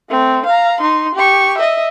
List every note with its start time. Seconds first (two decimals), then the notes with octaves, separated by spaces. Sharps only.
0.10 A3 C4
0.46 F5 A#5
0.80 D#4 C6
1.15 G4 C#6
1.58 D#5 E5